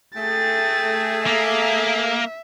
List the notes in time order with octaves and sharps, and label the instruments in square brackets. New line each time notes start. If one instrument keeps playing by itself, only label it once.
[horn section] A3 G#4 [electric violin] G5 A6
[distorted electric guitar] A#3 [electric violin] E5